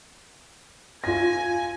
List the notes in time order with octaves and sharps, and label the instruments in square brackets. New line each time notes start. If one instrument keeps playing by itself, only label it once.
[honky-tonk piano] F4 A#6 [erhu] G#5